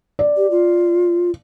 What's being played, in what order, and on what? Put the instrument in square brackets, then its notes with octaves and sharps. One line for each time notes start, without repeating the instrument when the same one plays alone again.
[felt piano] D5
[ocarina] G4
F4